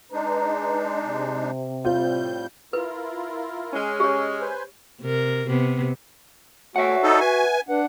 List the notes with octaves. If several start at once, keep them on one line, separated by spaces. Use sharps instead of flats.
G#3 D4 D#4 B4 A#5
C3
A2 G3 C4 F4 G6
E4 F4 A#4 B4
G#3 C#4
G4 C#5 D#5
B4 C5 G#5
C3 A#4
C3 B3
A3 F#4 C#5 E5 F#5
D#4 A4
B4 G#5
D4 B4 F#5